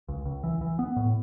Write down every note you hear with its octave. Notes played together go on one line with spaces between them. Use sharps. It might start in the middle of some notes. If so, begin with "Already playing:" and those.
C#2
C#2
E3
E3
B3
A2